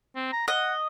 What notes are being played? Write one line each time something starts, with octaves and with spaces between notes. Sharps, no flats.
C4
A#5
D#5 F#5